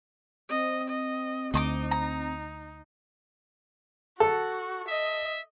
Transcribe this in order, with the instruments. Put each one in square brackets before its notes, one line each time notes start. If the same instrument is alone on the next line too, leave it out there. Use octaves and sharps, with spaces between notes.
[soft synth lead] C4 [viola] D#5
[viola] D#5
[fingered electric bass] D2 [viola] D#4 [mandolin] D#5 C#6 D6
[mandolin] A#5
[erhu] F#4 [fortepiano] A4
[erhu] D#5 [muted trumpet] E5